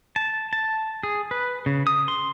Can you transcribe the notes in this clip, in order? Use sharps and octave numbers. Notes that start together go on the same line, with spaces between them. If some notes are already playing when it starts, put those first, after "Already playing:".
A5
A5
G#4
B4
C#3
D#6
C6